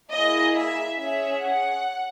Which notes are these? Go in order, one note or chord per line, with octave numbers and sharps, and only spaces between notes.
A#3 E4 G#4 D#5
E5
C#4 G#4 E5
F#5